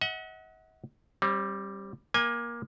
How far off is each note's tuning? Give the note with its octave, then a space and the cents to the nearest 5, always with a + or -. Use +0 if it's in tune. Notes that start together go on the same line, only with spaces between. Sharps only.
D#5 +45 F#5 +0
G3 +0 C4 +45
A#3 +20 G#5 -25